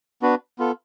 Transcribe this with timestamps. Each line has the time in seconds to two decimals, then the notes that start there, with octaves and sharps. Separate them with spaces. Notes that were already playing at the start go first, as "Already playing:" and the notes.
0.22 B3 D4 F#4 B4
0.59 B3 F4 A4